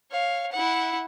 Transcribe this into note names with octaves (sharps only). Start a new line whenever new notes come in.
C#5 F5
E4 F#5